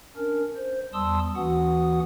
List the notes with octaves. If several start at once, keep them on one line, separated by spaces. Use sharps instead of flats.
C#4 D4 A#4
C5
E2 G3 A5 C6 D#6 E6
D#2 E3 C#4 F#4 F#5 D#6